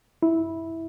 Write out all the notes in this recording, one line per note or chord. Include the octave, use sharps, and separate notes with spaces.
E4